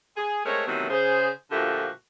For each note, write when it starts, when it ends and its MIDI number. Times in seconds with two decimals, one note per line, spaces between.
0.16 0.44 68
0.45 0.62 56
0.45 0.62 57
0.45 0.62 60
0.45 0.62 70
0.45 0.62 73
0.66 0.86 48
0.66 0.86 51
0.66 0.86 52
0.66 0.86 54
0.66 0.86 57
0.66 0.86 59
0.89 1.28 49
0.89 1.28 68
0.89 1.28 72
1.51 1.88 46
1.51 1.88 50
1.51 1.88 53
1.51 1.88 57
1.51 1.88 66
1.51 1.88 67